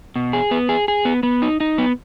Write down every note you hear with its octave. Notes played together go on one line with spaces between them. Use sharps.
B2
G#4
B3
G#4
G#4
B3
B3
D#4
D#4
B3